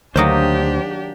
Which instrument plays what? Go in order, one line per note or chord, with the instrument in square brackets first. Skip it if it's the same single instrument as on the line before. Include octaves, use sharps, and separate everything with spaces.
[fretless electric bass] D2 [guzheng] D#3 F#3 A#3 [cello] D4 G4 [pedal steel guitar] C5 D#6